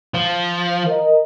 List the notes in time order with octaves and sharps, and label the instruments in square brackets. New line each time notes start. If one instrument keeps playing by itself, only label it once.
[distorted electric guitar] F3
[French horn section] A#4 D#5